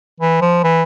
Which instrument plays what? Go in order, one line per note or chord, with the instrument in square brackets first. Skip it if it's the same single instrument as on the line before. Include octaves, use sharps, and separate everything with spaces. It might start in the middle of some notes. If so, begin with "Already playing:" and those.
[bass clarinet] E3
F3
E3